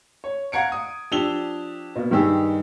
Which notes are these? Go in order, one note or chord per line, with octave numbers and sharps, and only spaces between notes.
C#5
F5 F#5 A#5 G#6 C#7 D7
D#6
F3 D4 G4 E6 F7 G7
B2 A#3
G2 D#3 D#4 G4 G#4 E6